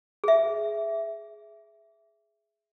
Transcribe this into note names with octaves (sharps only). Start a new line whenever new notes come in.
G#4 E5